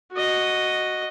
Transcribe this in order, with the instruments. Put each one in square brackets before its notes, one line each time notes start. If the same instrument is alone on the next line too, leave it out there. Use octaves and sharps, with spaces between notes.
[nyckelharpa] F#4 D#5